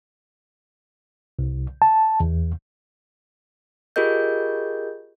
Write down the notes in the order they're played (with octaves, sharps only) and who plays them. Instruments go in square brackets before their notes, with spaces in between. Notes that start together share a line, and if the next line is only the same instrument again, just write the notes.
[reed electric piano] C2
A5
E2
[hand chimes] F4 G4 G#4 A#4 D#5 G6